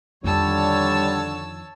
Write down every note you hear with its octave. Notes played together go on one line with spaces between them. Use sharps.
F2 D3 D#3 G3 C#5 A5 E6